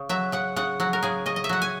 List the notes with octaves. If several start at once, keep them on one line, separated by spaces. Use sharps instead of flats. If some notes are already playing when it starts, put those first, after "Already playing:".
Already playing: C#3
F#3 E5
C#3 F#5
C#3 F#5
F#3 F#5
A#4
C#3 G#4
C#3 D#5
D#5
E5
F#3 F#5
G#5